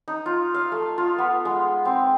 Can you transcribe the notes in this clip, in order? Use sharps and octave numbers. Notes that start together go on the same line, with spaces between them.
D#4
F4
F5
A3
F4
B3
G#3
C4